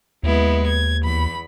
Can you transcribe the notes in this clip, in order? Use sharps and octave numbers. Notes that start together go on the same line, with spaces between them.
D#2 G#3 B3 E4
G#6
E2 B5